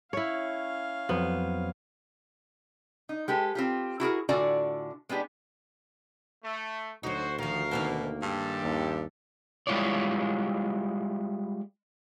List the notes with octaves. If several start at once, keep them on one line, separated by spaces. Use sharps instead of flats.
C#4 E4 C#5 F5
F2 F#3 B3 C5
D#4
G#3 G4 A4 B4
C4 F4 G4
E4 F#4 G#4 A#4
A2 D3 F4 F#4 D5 G#5
G#3 B3 D4 G4
A3
D2 F#3 D#4 F#4 C5
D#3 F3 F#4 A#4 F5
B2 D#3 A#3 C5
G2 G#3 G4 A4
D#2
G3 G#3 E4 F4 C#5 D5